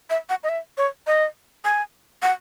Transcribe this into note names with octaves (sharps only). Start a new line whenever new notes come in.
E5
F#5
D#5
E5
C#5
D#5
G#5
F#5